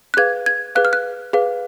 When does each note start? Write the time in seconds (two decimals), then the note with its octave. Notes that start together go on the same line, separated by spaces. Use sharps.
0.14 F#6
0.17 G#4 B4 F5 G#6
0.46 G#6
0.75 G#4 B4 F5 F#6
0.85 F6
0.93 F#6
1.33 G#4 B4 F5